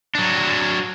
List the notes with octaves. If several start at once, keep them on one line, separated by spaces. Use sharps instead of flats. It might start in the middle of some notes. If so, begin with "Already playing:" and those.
F#3 D4